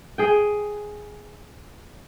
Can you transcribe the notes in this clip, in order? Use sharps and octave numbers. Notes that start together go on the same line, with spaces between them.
G#4 G5